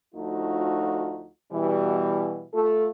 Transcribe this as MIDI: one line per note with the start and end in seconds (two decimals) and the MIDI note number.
0.15 1.28 38
0.15 1.28 53
0.15 1.28 57
0.15 1.28 63
0.15 1.28 65
0.15 1.28 66
1.52 2.44 47
1.52 2.44 52
1.52 2.44 55
2.53 2.87 57
2.53 2.87 65
2.53 2.87 69